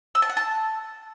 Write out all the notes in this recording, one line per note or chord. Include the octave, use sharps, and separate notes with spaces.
E6
A5
F#5
A5